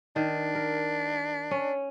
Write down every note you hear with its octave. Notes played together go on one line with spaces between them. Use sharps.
D#3 D4
A#4
C#4